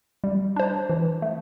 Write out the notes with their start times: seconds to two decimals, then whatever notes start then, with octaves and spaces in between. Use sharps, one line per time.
0.24 G3
0.56 D4 C5
0.89 E3
1.22 A3